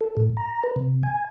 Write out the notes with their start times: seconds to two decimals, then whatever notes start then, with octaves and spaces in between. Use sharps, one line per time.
0.01 A4
0.17 A2
0.37 A#5
0.64 B4
0.76 C3
1.03 G#5